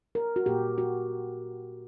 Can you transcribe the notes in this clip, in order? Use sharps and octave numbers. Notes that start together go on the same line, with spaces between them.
A#4
F#4
A#2 A#3 G4
F#4